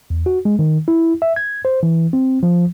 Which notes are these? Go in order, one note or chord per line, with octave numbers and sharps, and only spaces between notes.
E2
F#4
G#3
D#3
E4
E5
G#6
C5
E3
C4
F3